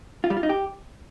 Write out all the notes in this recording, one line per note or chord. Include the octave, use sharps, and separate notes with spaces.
F4
G3
F4
D#4
G4